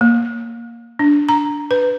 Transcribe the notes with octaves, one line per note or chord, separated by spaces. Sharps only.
A#3
D4
A#5
B4